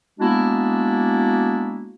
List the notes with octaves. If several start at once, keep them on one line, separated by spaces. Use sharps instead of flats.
G#3 A#3 B3 D4 E4 F#4